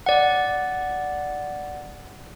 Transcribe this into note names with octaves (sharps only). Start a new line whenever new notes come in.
D5 F#5